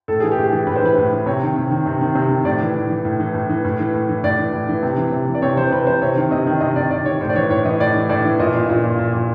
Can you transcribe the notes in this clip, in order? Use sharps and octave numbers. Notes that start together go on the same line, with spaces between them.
A2 A4
E3 G#4
G4
A2
G#4
E3
A2 B4
C5
E3 B4
A2
E3
C3 C#5
D#3
C3
D#3
C3
D#3
C3
D#3
A2 D5
E3
A2
E3
A2
E3
A2
E3
A2
E3
A2
E3
A2 D5
E3
A2
E3
C3
E3
C3
E3
D5
C3 C#5
E3 C5
C3 B4
E3 C5
C3 C#5
D#3
C3 D#5
D#3
C3 D#5
D#3 D5
C3 D5
D#3 C#5
A2 C5
D5
E3 C#5
A2 C#5
E3 D#5
A2 D5
E3
A2 D5
E3
A#2 D#5
A#2
A#2
A#2
A#2
A#2